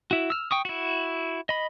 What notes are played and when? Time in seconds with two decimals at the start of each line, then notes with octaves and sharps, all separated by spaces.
0.11 E4 F#4
0.30 E6 F6
0.51 G5 C#6 D#6
0.65 E4 F#4
1.49 D#5 B5